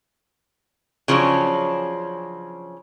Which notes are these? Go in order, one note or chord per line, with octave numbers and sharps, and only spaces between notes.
C#3 F3 F#3 C#4 D4